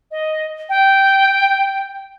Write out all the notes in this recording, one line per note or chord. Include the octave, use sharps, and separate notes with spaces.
D#5
G5